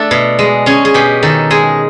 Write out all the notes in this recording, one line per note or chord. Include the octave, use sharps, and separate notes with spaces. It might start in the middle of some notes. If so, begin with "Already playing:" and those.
Already playing: A3 D4 A4
B2
G#3
C#4 G#4
G#4
B2 G4
D#3 A4
G#3 G#4